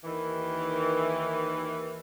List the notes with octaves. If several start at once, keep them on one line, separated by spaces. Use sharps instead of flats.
D#2 D#3 E3